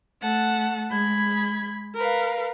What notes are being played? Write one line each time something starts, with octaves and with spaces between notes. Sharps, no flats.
A3 F#5 A5
G#3 B5 G#6
A#4 B4 F5